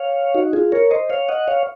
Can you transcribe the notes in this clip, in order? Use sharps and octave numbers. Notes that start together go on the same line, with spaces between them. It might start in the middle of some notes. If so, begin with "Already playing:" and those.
Already playing: C#5 F5
D#4 F#4
F4 G#4
A#4 C#5
C5 D#5
C#5 F5
D#5 F#5
C#5 F5